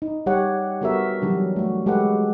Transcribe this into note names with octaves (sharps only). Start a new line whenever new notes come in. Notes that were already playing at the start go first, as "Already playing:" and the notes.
D#4
G3 G4 C#5 F#5
G3 B3 F#4 A4 A#4 E5
E3 F#3 G3 D4
A3 F#4
G#3 G4 A4 B4 F#5